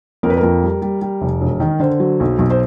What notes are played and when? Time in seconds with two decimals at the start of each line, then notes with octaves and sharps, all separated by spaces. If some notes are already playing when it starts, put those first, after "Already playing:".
0.23 F2 A#4
0.30 B4
0.37 A#4
0.43 F2
0.63 G3
0.82 G3
1.02 G3
1.21 F1
1.41 E1
1.60 D#3
1.80 D3 C5
2.00 F#3
2.20 B1
2.39 B1
2.50 C5